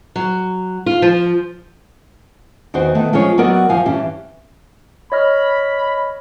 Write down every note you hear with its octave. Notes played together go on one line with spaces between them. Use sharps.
F#3
F4
F3
E2 D#3 F#4 C5
D#3 A3 B3
F3 G#3 C#4 F4 C#5
F#3 B3 F#4 A#4 D5 D#5
F#2 F3 F5 G#5
G2 E3 C#4 G4
C#5 D#5 B5 F6